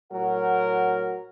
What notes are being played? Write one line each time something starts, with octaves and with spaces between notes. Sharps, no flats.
A2 F#3 A#4 F#5